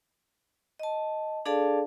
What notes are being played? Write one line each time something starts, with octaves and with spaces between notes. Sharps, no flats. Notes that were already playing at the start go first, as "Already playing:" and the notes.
D#5 A5
D4 G#4 A4 D5 F5 A5